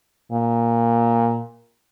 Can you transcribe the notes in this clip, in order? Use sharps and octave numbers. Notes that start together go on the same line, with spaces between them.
A#2